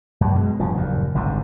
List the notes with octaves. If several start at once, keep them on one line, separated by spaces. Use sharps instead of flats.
F#2
B2 G#3
F1 G2 F3
F#1 D#2 A#2
G1 C2 G#2 D3